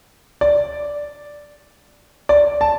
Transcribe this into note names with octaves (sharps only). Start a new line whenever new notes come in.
D5
D5
A5